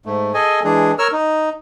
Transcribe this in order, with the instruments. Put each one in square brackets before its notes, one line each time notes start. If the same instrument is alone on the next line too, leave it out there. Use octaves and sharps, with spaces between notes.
[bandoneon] G#2 A3
G#4 A4 D#5 G#5
E3 G#3 D4 G#4
A#4 C#5 E6 F6
D#4